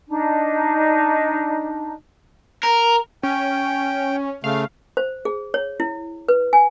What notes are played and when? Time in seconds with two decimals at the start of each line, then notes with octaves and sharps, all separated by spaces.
0.08 D4 D#4
2.63 A#4
3.23 C#4 G5
4.44 C#3 A3 F5
4.97 C5
5.25 G#4
5.54 C#5
5.80 E4
6.28 B4
6.53 G#5